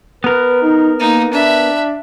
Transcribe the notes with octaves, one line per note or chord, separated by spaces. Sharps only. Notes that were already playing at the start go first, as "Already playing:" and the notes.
B3 A#4 B4
D#4
A#3 D#4
D4 E5 B5